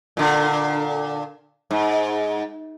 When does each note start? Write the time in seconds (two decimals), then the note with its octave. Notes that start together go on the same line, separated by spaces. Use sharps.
0.17 A#2 D3
1.71 G#2